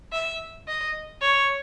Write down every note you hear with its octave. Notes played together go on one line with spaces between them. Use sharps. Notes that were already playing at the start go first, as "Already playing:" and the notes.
E5
D#5
C#5